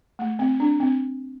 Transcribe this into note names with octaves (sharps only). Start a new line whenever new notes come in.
A3
C4
D4
C4